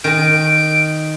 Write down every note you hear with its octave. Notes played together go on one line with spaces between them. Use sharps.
D#3 D7